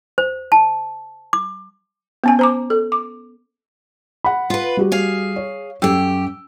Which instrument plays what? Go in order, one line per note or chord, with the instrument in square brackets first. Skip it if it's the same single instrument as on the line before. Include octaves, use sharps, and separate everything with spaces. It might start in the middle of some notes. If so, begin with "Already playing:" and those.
[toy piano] C5
A5
D6
[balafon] B3 C#4 G#5
C5 A#5 D6
A4
D6
[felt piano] F#5 B5
[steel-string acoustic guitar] F4 B4
[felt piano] G3 F#4 G4
[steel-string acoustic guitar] G#4 F5
[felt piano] C#5
[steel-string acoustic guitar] F#2 G4 [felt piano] A4 G5 E6